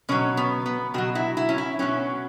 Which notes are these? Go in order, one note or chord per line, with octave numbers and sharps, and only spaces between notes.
B2 F#3 C#4
B3
B3
B2 F#3 F#4
E4
E4
C#4
E4
B2 F#3 C#4